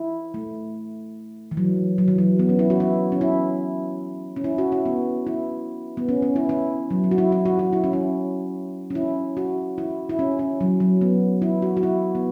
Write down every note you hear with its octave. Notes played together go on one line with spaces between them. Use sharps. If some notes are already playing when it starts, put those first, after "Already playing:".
Already playing: E4
A3
E3
F#3
F#3
E3
F#3
B3
C#4
E4
F#4
E4
C#4
E4
C#4
E4
F#4
E4
B3
E4
B3
C#4
C#4
E4
E4
F#3
F#3
F#4
E4
E4
F#4
F#4
E4
C#4
E4
C#4
E4
F#4
E4
E4
C#4
E4
F#3
F#3
B3
E4
F#4
F#4
E4
B3